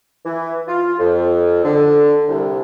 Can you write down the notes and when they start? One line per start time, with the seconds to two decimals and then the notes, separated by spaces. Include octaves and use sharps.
0.25 E3
0.68 F4
0.99 F2
1.63 D3
2.28 C2